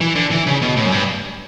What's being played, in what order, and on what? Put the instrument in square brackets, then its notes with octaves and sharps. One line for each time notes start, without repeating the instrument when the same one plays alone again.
[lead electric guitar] E3
D3
E3
C#3
B2
A2
F#2
G2